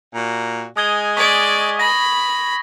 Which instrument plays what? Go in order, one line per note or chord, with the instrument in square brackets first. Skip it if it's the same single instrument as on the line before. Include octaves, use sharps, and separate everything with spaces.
[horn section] A#2 F#4 A#5
[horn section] G#3 D#5 G#5 [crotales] D#6 G#6 G7
[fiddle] D5 [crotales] C#6 D#6 B6
[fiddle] B5 [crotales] A#6